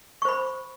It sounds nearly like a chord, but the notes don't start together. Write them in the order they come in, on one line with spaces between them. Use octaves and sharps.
C#6 C5 B5